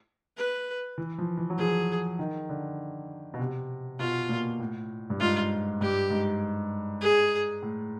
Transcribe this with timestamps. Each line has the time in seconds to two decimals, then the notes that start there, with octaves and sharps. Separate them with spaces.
0.37 B4
0.98 E3
1.18 F3
1.37 E3
1.50 F#3
1.58 F3 G#4
2.19 D#3
2.49 D3
3.34 B2
3.40 C3
3.99 B2 F4
4.29 A#2
4.60 A2
5.10 G2
5.20 G#2 F4
5.81 G2 G4
6.10 G#2
7.01 G#4
7.62 A2